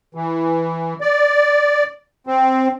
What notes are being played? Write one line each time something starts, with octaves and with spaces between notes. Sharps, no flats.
E3
D5
C4